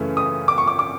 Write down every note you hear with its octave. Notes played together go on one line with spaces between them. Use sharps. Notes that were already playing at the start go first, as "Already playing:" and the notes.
Already playing: F#2 C#3 E3 A3
D#6
D6
C#6
D6
D6